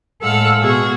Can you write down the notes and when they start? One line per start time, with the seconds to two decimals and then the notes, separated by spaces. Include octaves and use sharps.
0.23 A2 G#3 A4 F5 F#5 E6
0.62 B2 F#4 G#4